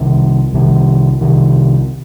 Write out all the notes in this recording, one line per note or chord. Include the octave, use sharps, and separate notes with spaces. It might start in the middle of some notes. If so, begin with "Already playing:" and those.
Already playing: C2 C3 D#3
C2 C3 D#3
C2 C3 D#3